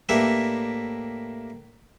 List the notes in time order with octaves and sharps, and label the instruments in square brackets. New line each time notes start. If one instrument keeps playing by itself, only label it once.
[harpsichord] A2 A#3 D4 G4 B4 E5